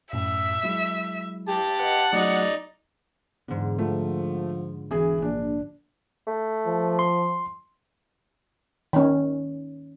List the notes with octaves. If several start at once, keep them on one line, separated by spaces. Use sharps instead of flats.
F#2 A2 E5
F#3 G#3 E4
G4 A5
B4 D#5 F#5
F#3 A3 D#4 F#4 D5
E2 G#2 D3
F3 A3
E1 E3 G#4
A#1 D4
A3
F3
C6
D#3 C#4